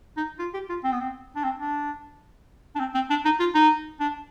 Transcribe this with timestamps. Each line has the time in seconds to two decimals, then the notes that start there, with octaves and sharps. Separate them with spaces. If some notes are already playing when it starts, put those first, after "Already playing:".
0.17 D#4
0.39 F4
0.54 G4
0.69 F4
0.84 C4
0.92 B3
1.00 C4
1.36 D4
1.44 C4
1.59 D4
2.75 D4
2.80 C4
2.95 C4
3.10 D4
3.25 D#4
3.40 F4
3.55 D#4
4.00 D4